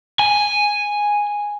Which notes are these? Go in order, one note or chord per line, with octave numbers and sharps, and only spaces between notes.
G#5